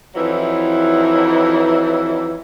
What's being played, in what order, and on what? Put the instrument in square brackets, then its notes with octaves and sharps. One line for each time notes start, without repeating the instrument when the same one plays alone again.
[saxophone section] F2 E3 F#3 D#4 E4